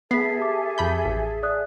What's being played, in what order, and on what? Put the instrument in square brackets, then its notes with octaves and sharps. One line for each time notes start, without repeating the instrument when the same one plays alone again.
[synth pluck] B3 [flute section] G#4 A4 E5 [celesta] B6 C7
[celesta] G4 A5 D6
[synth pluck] F2 B5 G6
A1
[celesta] D5 D#6 F#6